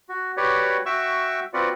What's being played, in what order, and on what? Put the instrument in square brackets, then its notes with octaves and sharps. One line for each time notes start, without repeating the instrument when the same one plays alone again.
[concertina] F#4
F#4 G4 B4 C#5 D5 F#5
F#4 E5 G5 C#6 E6
C4 F4 F#4 B4 D5 F#5